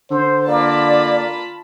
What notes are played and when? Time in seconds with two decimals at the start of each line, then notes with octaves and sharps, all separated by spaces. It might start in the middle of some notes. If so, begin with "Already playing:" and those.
0.11 D3 C5
0.47 A#3 F4 D5 A5 B5